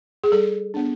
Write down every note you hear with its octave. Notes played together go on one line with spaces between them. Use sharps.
G#4
G3 A4
B3 D4